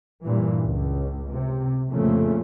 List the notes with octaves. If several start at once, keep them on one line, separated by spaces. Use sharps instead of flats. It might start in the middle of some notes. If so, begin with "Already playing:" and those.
G2 A#2 E3
C#2
C3
F2 A#2 C#3 F3 A3